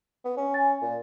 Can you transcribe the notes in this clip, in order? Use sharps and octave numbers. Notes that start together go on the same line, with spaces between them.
B3
C#4
G#5 A6
A#2